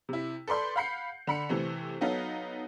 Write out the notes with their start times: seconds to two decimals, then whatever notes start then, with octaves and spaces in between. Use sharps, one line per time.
0.09 C3 E4
0.48 A4 B4 D5 C6 G6
0.76 F5 F#5 B5 G6 C7 C#7
1.27 D3 B5 C#7
1.49 C3 E3 A3 C4
2.01 F#3 B3 D#4 A4 F5